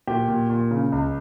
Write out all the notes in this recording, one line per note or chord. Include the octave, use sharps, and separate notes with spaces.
A#2 G4
A#2
A#2
C#3
C#2